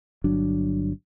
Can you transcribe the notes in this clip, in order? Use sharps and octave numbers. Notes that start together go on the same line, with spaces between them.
G1 F#3 D4